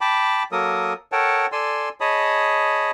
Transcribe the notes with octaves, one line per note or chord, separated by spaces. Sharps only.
G5 A5 B5 D6
F#3 A#3 A4 A#4 D#6
A4 A#4 C#5 F#5 G5 A5
A4 D5 G#5 C6 E6
G#4 C#5 D#5 A5 B5 D#6